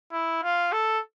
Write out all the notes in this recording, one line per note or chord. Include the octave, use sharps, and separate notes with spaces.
E4
F4
A4